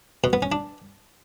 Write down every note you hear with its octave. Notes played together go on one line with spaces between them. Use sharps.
B2
B3
C#4
D4